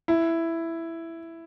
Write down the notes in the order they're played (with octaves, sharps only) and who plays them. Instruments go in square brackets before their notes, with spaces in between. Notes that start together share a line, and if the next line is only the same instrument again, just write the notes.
[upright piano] E4